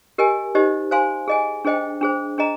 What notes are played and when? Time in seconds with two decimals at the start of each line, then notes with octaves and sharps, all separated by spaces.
0.18 G4 A#4 D#5 G#5
0.55 D#4 G4 C5 D#5
0.91 C5 F5 G#5 C6
1.28 G#4 D#5 G#5
1.65 D4 G#4 C5 D#5 G5
2.01 D4 G#4 C5
2.38 D4 G#4 D#5 A#5